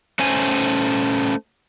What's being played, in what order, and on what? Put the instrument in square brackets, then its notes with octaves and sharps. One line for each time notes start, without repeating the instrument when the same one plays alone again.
[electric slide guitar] A3 C#4 C5 G#5